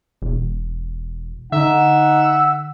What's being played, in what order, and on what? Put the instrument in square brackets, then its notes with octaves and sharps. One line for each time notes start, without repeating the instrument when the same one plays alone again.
[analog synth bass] E1
[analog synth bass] D3 [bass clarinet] D#4 [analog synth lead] E5 [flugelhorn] F#5